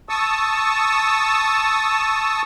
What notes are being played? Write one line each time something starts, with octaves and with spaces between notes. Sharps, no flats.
A5 C#6 D#6 E6